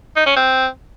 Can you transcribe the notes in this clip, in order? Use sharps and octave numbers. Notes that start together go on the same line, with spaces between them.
D#4
C#4
C4